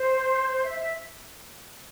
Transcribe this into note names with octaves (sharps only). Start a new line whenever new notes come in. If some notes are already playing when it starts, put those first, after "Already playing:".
Already playing: C5
E5
E5